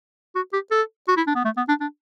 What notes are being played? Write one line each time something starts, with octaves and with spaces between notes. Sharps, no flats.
F#4
G4
A4
F#4
E4
D4
B3
A3
B3
D4
D4